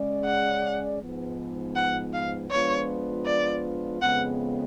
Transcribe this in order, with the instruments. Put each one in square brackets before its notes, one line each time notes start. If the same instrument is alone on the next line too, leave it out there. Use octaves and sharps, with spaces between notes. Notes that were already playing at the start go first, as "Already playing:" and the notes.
Already playing: [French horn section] C#3 G#3 C#4 G#4 D5
[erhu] F#5
[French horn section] G#2 F3 B3
[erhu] F#5
F5
[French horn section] F3 G#3 B3 D4 F4 [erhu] C#5
[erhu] D5
[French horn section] F2 C#3 G#3 B3 [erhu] F#5